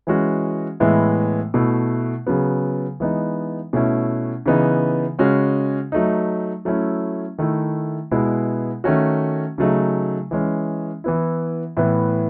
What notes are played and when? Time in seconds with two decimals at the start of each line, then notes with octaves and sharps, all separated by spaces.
0.07 E3 G#3 C#4 F#4
0.80 A2 E3 G#3 B3
1.54 B2 A3 E4
2.27 C#3 F#3 B3
3.00 E3 G#3 B3 D#4
3.73 B2 A3 C#4 E4
4.46 C#3 E3 B3 D#4
5.19 C#3 G#3 C#4 F#4
5.92 F#3 A3 D#4
6.65 F#3 A3 C#4 E4
7.38 D#3 A3 E4
8.11 B2 G#3 B3 E4
8.84 D#3 A3 C#4 F#4
9.58 C#3 F#3 A3 D#4
10.31 E3 G#3 C#4
11.04 E3 B3 E4
11.77 A2 E3 B3